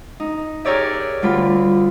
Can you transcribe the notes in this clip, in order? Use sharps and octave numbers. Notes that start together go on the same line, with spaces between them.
D#4
G4 G#4 A#4 C#5 D5 E5
D2 G3 F4 B5